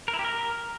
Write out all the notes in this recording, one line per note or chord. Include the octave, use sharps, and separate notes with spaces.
A#4
E4
G4
A#4